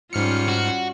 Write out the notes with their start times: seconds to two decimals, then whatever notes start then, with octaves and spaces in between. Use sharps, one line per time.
0.13 G#2 G3 C#4 F4 F6 C#7
0.48 F#4